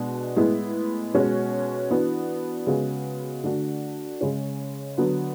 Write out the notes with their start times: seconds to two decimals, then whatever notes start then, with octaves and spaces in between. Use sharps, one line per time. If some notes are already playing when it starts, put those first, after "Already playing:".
Already playing: B2 G#3 D4 F#4
0.36 A2 G#3 B3 E4
1.14 B2 G#3 C#4 F#4
1.90 E3 B3 D4 F#4
2.67 C#3 G#3 B3 F#4
3.44 D3 A3 D4 F#4
4.21 C#3 G#3 C#4
4.98 D3 F#3 B3 F#4